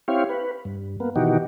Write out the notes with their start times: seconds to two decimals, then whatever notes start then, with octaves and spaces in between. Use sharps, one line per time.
0.08 C4 E4 G4 C#5 F5
0.29 B4
0.65 G2
1.00 A#3 B3
1.16 B2 D#3 E3 D#4 F#4 G4